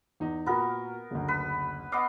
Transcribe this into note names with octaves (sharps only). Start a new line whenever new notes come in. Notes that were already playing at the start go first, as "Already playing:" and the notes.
E2 D#4
A#2 B3 F#4 A#4
F#1 D2
B4
B3 D#5 F5 D6